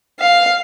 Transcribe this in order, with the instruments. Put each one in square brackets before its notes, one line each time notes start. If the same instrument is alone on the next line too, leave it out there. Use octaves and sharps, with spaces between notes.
[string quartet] F5